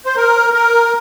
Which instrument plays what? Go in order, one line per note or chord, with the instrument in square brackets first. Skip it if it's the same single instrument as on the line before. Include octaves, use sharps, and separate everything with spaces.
[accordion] C5
A#4
A#4